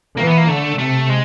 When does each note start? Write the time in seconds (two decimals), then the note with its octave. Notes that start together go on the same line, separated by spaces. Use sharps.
0.18 E3 A#3
0.28 B3
0.38 A#3
0.48 D3 A3
0.79 C3 A3
1.09 G#3